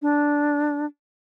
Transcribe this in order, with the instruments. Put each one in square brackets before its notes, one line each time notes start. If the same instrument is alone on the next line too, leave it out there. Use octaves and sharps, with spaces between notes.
[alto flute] D4